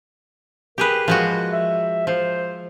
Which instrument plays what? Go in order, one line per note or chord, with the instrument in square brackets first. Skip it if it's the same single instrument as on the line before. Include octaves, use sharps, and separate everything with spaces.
[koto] G4 G#4 B4 [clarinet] A#4
[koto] F3 G#3 F#4
[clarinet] E5
[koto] F3 [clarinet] C5